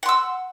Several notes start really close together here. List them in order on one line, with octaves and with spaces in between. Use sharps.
F#5 C6 E6